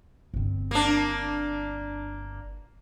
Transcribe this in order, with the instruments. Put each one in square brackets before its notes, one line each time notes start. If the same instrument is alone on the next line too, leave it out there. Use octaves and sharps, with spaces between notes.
[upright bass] G1 C4
[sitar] A#3 D4